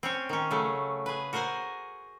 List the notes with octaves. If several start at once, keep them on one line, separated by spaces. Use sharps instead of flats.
C4 C#4 C#5
D#3 C#4
C#3 F#3 A3
G#4 B4
F#4 A#4 C5 F#5 G#5